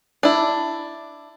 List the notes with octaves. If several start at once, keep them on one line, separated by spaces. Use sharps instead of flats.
D4 E4